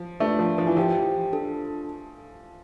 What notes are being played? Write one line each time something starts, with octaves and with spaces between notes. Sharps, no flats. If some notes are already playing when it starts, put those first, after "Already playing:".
Already playing: F3
A3 D4 F4 B4 D5
F3
F3
E3
F3 G4 C5 G5
D4 F4 A4